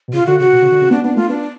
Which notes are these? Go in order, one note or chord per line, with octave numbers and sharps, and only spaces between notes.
B2
C#3 F4
D3 F#4
C#3 F#4
B2
C#3
D3
C#3
B3 D4
B3 D4
A3 F4
B3 D4